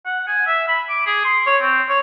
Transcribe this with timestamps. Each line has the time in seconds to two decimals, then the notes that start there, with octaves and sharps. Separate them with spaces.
0.06 F#5
0.27 G#5
0.47 E5
0.68 B5
0.89 D6
1.06 G#4
1.25 C6
1.46 C#5
1.62 C4
1.89 C#5